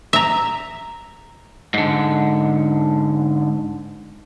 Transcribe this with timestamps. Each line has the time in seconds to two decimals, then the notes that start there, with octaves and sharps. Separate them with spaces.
0.13 E5 A#5
1.74 G#2 D3